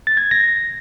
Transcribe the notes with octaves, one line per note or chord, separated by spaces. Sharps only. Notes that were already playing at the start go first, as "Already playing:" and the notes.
A6
G#6
A#6